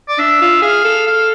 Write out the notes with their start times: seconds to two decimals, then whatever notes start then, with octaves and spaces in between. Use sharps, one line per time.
0.08 D5
0.18 D4 E5
0.41 F4
0.62 G#4 F5
0.85 A4
1.07 F5